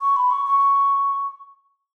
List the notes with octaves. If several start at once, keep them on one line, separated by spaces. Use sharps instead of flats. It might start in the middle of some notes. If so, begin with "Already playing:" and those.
C#6
B5
C#6
C#6